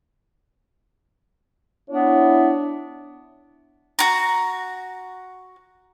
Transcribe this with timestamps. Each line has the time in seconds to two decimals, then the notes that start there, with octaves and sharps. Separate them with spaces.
1.90 B3 D4 E4 C#5
3.99 F#4 A#5